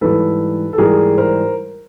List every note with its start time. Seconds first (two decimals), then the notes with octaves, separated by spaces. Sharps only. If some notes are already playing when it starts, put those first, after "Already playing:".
0.01 G#2 E3 G3 A4 B4
0.73 A4
0.78 G#2 E3 G3 G#4 A#4
1.18 A#4 C5